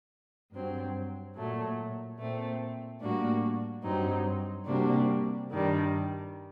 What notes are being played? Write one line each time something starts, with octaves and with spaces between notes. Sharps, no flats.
G2 F#3 C4
A#2 F#3 A3
A#2 A3 C4
A2 G3 A#3 D4 F#4
G2 F#3 C4 D#4
C3 G3 A#3 D4 F#4
G2 D#3 G3 D4